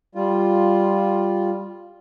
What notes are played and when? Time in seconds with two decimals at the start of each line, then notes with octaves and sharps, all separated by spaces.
0.15 G3 F4